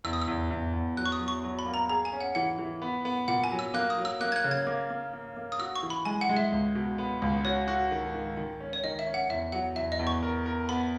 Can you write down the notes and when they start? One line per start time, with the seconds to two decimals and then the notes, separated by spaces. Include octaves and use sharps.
0.04 E2 E6
0.13 D#6
0.21 E6
0.27 E2
0.51 E2
0.73 E2
0.97 F#3 F#6
1.06 C#6
1.12 D#6
1.20 F#3
1.28 C#6
1.43 F#3
1.59 B5
1.66 A#3
1.74 A#5
1.89 G#4 A#5
2.05 G#5
2.13 C#4
2.21 F#5
2.35 E3 F#5
2.59 E3
2.82 B3
3.05 B3
3.28 A#2 F#5
3.44 G#5
3.51 F#3
3.59 E6
3.74 A#3 F#6
3.90 D#6
3.98 F#3
4.05 E6
4.21 A#3 F#6
4.32 G#6
4.36 F#6
4.44 C#3
4.51 G#6
4.67 A#3
4.90 A#3
5.13 A#3
5.36 A#3
5.52 D#6
5.59 F#4 E6
5.76 C#6
5.83 E3
5.90 B5
6.05 G#3 G#5
6.21 F#5
6.29 G#3
6.37 E5
6.52 C#2
6.75 B2
6.98 B3
7.22 C#2
7.45 F#4 C#5
7.68 F#4
7.91 D#3
8.14 D#3
8.37 D#3
8.60 C#4
8.73 C#5
8.84 D#3 D#5
8.99 E5
9.07 C#4
9.14 F#5
9.30 E2 E5
9.52 F#3 F#5
9.76 E2 E5
9.92 D#5
9.99 E2
10.07 C#6
10.23 A#4
10.46 A#4
10.69 B3 B5